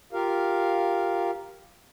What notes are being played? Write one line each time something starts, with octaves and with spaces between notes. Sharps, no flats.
F4 G4 A#4 F5